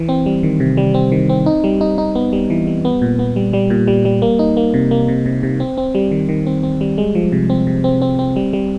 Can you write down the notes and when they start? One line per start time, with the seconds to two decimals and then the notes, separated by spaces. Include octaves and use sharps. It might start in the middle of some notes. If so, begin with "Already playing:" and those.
Already playing: E3
0.09 C4
0.26 G3
0.43 D#3
0.60 C3
0.77 G3
0.94 C4
1.12 D#3
1.29 C4
1.46 D#4
1.64 G3
1.81 D#4
1.98 D#4
2.15 B3
2.33 G3
2.50 E3
2.67 G3
2.85 B3
3.02 A#2
3.19 B3
3.36 G3
3.53 G3
3.70 A#2
3.87 G3
4.05 G3
4.22 A#3
4.39 D#4
4.57 A#3
4.74 C3
4.91 A#3
5.08 C3
5.26 C3
5.43 C3
5.60 C4
5.77 C4
5.95 G3
6.11 D#3
6.29 D#3
6.46 C4
6.63 C4
6.81 G3
6.98 G#3
7.15 F3
7.32 C3
7.50 C4
7.67 C3
7.84 C4
8.02 C4
8.19 C4
8.36 G3
8.53 G3